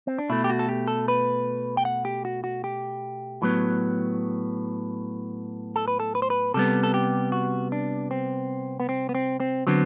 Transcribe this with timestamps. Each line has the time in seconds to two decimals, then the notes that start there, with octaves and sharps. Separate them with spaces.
0.07 C4
0.18 D4
0.30 B2 A3 E4
0.44 G4
0.50 F#4
0.59 A4
0.69 G4
0.88 A4
1.08 B4
1.77 G5
1.85 F#5
2.05 G4
2.25 F#4
2.44 F#4
2.64 G4
3.42 A2 F#3 B3
5.76 A4
5.88 B4
6.00 A4
6.15 B4
6.22 C5
6.30 B4
6.54 C3 G3 B3 A4
6.83 A4
6.94 G4
7.32 F#4
7.72 D4
8.11 C4
8.80 B3
8.89 C4
9.09 B3
9.15 C4
9.40 C4
9.67 D3 F#3 B3 C4